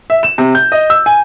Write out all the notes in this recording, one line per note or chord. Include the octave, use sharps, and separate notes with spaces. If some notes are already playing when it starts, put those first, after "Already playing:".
E5
E7
C3
G6
D#5
E6
G#5